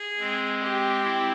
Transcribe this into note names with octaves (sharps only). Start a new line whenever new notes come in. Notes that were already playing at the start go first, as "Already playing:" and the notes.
Already playing: G#4
G#3 C4
G4
C4 E4